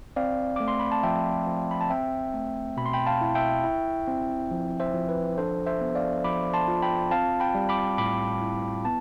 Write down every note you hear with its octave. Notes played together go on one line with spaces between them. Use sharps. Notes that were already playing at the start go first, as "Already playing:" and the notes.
C4 D5 F5
A3 D6
C6
B5
A5
F3 E5 G5
F3
B5
A5
C4 E5 G5
A3
B2 B5
C6
G5 B5
F5 A5
E4
E5 G5
E4
C4
F3
C5 E5
F3
B4
D4 A4 C5
C5 E5
B3
D5 F5
F3 B5 D6
A5 C6
F4
G5 B5
C4 F5 A5
G5 B5
G3
B5 D6
A2 B5 D6
E4
B3 A5